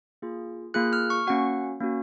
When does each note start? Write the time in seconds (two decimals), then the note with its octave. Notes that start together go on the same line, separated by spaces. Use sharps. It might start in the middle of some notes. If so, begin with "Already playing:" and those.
0.22 A#3 F4 G#4
0.74 A#3 F4 G#4 F#6
0.93 F6
1.10 C#6
1.27 A#3 C#4 F#4 F#5
1.80 A#3 C#4 F#4